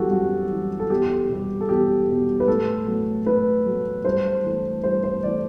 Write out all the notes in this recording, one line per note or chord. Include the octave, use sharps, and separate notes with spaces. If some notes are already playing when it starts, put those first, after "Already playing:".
Already playing: F#2 E3 G3 F#4 G4 A4
F#2 F#4
E3 G3
A4
E2 G4
B2 G3
A4
E2 G4
B2 G3
B4
A2 A4
F#3 A3
A2 B4
F#3 A3
G2 C5
E3 A3
G2 C5
C5
E3 A3 D5